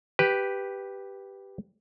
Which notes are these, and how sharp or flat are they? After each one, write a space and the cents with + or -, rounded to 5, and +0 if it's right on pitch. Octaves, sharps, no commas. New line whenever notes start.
G4 +0 B4 +0